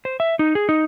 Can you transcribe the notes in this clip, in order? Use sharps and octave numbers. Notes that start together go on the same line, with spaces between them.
C5
E5
D#4
G#4
D#4